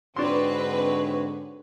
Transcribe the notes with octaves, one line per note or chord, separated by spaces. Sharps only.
G#2 D3 C4 D4 F#4 B4 C#5 C6